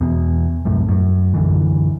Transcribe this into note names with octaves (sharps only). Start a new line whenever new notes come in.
E2 B2
C2 F#2 A2
F#2
B1 F#2 D3 E3